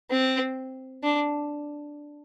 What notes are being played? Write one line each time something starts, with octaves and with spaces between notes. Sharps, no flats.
C4
D4